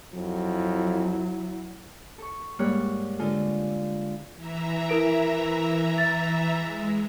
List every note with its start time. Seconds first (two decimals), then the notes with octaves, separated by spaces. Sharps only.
0.15 F2 F#3 E4
2.18 A4 C#6
2.59 G#2 G3 A#3 C#5 F#6
3.19 D3 G#3 F4 A4 F5
4.36 E3 E5 A#5
4.89 E4 A#4 D7
5.98 A6
6.58 G#3